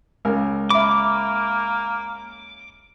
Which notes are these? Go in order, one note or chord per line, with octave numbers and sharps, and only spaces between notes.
C#2 A#4 G#5
A#3 E5 B5 D6